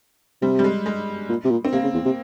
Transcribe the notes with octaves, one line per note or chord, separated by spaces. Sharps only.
C3 G3
G3
G#3
G#3
A#2
C3
A#2
C4
C3 A#3
C#3
E2
C3